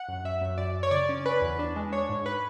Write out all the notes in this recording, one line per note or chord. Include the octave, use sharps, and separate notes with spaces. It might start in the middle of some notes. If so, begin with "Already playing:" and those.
Already playing: F#5
F#2
F#2 E5
F#2
F#2 D5
F#2
C#5
C#3 D5
C#4
C#4 B4
E2
D4
G#3
D4 C#5
G#2
B4